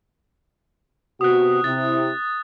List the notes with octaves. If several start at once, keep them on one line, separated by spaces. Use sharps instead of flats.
C3 B3 F#4 D#6 F#6
C3 E4 A6